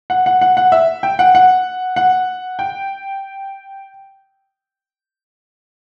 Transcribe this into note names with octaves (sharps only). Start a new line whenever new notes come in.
F#5
F#5
F#5
F#5
E5
G5
F#5
F#5
F#5
G5